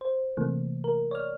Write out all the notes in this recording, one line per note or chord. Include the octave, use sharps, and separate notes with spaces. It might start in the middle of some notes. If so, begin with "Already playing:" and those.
C5
C3 E3 A3 A#3
A#4
C#5 D5 F6